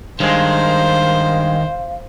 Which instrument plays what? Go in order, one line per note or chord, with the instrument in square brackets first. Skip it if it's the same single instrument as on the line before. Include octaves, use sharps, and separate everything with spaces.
[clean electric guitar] G2 G#3 [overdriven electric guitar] D#3 [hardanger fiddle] C5 [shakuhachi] F5